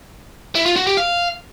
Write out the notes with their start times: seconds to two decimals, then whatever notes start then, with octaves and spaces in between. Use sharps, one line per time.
0.55 E4
0.66 F4
0.76 F#4
0.87 G4
0.97 F5